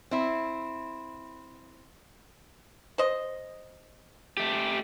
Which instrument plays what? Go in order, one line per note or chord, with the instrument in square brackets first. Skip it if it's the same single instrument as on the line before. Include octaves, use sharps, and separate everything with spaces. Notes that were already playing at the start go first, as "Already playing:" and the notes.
[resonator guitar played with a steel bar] C4 E4
[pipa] C5 D#5
[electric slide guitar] A3 G4